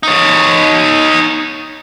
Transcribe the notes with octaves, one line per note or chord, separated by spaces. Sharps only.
D#4 C#5